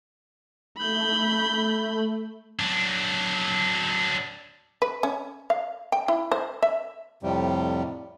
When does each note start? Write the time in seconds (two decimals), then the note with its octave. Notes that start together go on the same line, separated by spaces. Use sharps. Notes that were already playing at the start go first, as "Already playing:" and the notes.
0.78 A3 B5 G6
2.59 F#3 D4
4.82 B4
5.03 C#4
5.50 F5
5.92 G5
6.08 E4
6.32 C5
6.63 E5
7.23 F2 A2 C3 G3